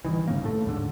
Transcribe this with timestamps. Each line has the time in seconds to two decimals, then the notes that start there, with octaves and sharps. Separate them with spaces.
0.05 G2 D#3 E3
0.28 G2 C#3 A#3
0.43 A2 A3
0.66 D#2 G#2 D3